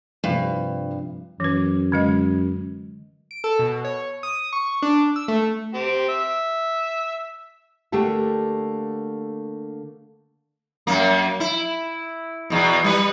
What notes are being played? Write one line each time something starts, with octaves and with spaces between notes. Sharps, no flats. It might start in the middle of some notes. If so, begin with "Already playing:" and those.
G2 C3 F3
F#2 E3 B4
D3 G#3 D#5
D7
A4
B2
C#5
D#6
C#6
D4
E6
A3
C4 G4
E5
D3 A3 A#3 G4 A4
F#2 A#3
E4
E2 B2
G3 B4